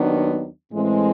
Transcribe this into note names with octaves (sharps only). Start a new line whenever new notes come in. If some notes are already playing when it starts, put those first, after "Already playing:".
Already playing: D#2 D#3 F#3 B3 D4
A2 E3 G#3 C4